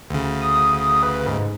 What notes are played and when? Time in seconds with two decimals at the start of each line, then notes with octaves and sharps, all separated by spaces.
0.10 D2 C#3
0.41 D#6
1.03 B4
1.27 G#2